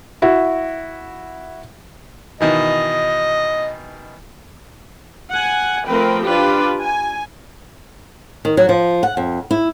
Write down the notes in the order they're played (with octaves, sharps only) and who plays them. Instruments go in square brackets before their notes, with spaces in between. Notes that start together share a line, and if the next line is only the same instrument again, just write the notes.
[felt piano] E4 F#4
[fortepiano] B2 D#3 E3 [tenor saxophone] D#5
[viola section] F#5 G#5
F3 A3 C4 A#4 B4 G5
D4 F4 G4 B4
G#5
[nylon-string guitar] D#3
F#3
F3
F#5
F2
E4